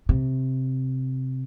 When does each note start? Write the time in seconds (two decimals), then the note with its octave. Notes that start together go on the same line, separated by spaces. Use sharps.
0.09 C3